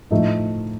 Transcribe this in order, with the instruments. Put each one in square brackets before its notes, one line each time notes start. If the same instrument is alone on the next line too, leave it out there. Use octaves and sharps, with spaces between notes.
[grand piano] A2 F3 A3 D#4